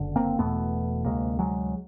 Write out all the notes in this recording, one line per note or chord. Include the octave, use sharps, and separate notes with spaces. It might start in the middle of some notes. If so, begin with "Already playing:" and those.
Already playing: F#1 D3
A#3 C4
E1 E2 B2 A3 B3
D2 C3 G#3 A#3
F#3 G#3